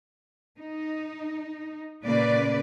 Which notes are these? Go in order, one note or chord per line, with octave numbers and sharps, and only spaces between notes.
D#4
A#2 C#3 A#3 B4 D5